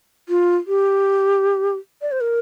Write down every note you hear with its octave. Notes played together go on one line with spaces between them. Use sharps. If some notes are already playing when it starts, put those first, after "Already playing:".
F4
G4
D5
C5
A#4